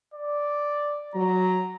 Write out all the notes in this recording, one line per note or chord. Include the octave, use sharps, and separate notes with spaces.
D5
F#3 A#5